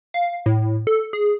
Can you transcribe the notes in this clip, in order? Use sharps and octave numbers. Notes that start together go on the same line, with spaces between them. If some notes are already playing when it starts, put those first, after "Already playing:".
F5
A2
A4
G#4